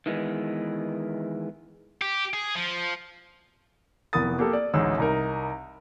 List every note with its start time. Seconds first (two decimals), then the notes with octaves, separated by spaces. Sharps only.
0.06 D#3 E3 G#3 B3
2.01 G4
2.34 G#4
2.55 F3
4.13 F1 E3 B3 A#4 D#6 A6
4.39 A#3 G4 A4
4.53 D5
4.74 A1 D2 G#3 D#4 E6
4.98 C2 D#4 A#4